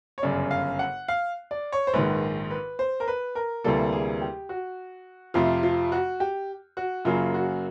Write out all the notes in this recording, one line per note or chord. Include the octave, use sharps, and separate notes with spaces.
C#5
G1 F#2 C#3 D5
F5
F#5
F5
D5
C#5
C5
A#1 G#2 D#3 B4
B4
C5
A#4
B4
A#4
D2 C3 E3 G3 A#3 A4
G#4
G4
F#4
F2 C3 F3 A3 F4
F4
F#4
G4
F#4
F#2 C#3 F#3 A#3 F4
F#4